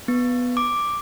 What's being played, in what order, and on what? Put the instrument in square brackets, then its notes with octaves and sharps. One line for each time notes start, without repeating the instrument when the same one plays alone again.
[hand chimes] B3
D6